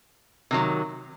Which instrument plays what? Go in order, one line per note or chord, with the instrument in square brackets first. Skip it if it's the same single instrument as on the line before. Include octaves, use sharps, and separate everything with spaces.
[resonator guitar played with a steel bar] C3 D#3 F#3